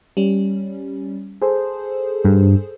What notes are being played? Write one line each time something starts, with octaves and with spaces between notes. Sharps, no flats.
G3 C#4
G#4 A4 C5
G2